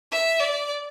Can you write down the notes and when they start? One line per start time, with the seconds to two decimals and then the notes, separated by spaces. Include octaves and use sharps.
0.11 E5
0.40 D5